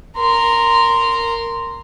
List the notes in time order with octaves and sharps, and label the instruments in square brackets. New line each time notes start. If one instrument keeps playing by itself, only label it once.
[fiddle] A#4 C6